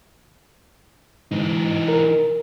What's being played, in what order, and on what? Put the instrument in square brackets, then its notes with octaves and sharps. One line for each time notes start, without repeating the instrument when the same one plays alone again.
[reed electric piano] G#2 [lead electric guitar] E3 D#4
[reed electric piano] A#4